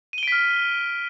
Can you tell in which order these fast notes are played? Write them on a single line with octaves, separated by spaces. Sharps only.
D#7 G7 D7 B6 F6